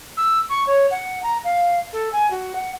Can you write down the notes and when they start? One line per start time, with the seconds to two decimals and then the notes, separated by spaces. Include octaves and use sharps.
0.17 E6
0.49 C#6
0.67 C#5
0.91 F#5
1.23 A#5
1.44 F5
1.93 A4
2.13 G#5
2.31 F#4
2.55 F#5